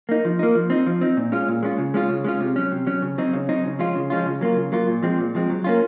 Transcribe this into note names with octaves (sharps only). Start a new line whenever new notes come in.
A#3 D#4
F3
A#3 D#4
F3
C4 D#4
F3
C4 D#4
A#2
G#3 C#4 F4
A#2
G#3 C#4 F4
C#3
G#3 C#4 F4
C#3
G#3 C#4 F4
C3
F#3 C#4
C3
F#3 C#4
C#3
F#3 C4 D#4
C#3
F#3 C4 D#4
C#3
F3 G#3 C#4 F4
C#3
F3 G#3 C#4 F4
C#3
F#3 A#3 F4
C#3
F#3 A#3 F4
A#2
F3 G#3 C4
A#2
F3 G#3 C4
F#3
A#3 C#4 F4